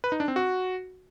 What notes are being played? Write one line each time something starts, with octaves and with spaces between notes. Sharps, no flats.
B4
D#4
D4
C4
F#4